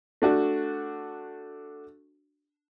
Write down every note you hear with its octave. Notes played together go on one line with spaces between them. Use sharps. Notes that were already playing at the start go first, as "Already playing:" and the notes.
A3 D4 F#4